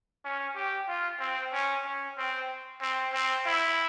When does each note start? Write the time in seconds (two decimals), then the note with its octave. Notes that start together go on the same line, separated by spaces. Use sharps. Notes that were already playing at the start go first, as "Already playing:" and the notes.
0.25 C#4
0.56 G4
0.88 F4
1.20 C4
1.53 C#4
1.86 C#4
2.18 C4
2.82 C4
3.14 C4
3.46 E4